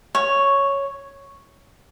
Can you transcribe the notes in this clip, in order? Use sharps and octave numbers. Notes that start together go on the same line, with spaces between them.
C#5